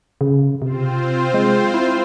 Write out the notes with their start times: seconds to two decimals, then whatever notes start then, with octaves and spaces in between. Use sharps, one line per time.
0.21 C#3
0.62 C3 C4 F4 C5
1.34 G#3
1.74 E4